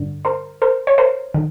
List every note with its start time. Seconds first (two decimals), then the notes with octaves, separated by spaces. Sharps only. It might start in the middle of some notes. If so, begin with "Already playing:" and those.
Already playing: G2 D3
0.25 A#4 C5
0.62 A#4 C5
0.87 C#5
0.98 A#4 C5
1.34 D#3